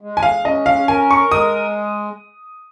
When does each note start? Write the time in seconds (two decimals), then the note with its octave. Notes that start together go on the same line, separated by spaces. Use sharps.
0.01 G#3
0.17 G#5
0.23 F5
0.44 C#4 D#5
0.66 F5
0.88 A#4 G#5
1.11 C#6
1.32 G#3 D#6